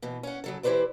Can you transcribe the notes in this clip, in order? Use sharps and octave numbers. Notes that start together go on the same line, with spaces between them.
B2 E3
C#4 F#5
C#3 F#3 A4
E3 E4 G4 B4 C5 D5